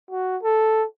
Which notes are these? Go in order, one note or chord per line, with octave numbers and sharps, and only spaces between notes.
F#4
A4